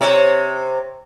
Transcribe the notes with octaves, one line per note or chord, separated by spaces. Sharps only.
C3 C#5